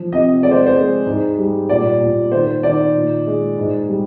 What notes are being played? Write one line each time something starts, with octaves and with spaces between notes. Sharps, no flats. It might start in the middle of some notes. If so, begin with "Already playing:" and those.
Already playing: F3
C3 D#5
G#3 D5
C5
C5
G#3
G#2
G3
A#2 D5
A#2
D#3 C5
D#3 D5
A#2
G#3
G#2
G3